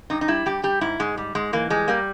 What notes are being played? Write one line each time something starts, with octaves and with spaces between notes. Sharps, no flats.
G2 D#4
D#4
G3 E4
G3 G4
G3 G4
G#2 E4
G#2 G#3
G3
G#2 G#3
E3 A#3
G3 G#3
G3 A#3